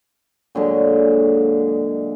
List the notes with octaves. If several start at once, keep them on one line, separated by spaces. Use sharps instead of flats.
A#2 D3 F#3 G#3